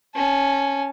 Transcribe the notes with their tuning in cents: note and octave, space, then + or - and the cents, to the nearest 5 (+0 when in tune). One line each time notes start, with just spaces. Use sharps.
C#4 -5 A5 -20